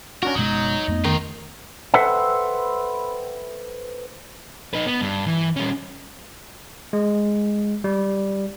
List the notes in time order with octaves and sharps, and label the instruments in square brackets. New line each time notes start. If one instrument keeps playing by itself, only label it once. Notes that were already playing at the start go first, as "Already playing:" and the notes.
[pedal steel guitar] C#4 D4 F#4 [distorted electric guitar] A#4
[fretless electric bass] F#1 B2 G#3 [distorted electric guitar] F#3 [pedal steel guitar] D#4 D#6
[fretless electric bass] F2 A3 B3
[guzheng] D#3 [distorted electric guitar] F4 G4
[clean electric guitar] A4 B4 C5 E5 F#5 G5
[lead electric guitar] D#4 B4
B3
G2
E3
G3 C#4
[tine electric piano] G#3
G3